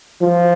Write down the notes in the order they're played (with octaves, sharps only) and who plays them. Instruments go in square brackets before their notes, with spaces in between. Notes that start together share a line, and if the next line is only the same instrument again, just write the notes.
[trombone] F3